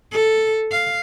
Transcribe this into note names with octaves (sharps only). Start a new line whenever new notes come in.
A4
F5